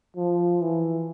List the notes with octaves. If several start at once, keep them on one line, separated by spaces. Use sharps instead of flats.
F3
E3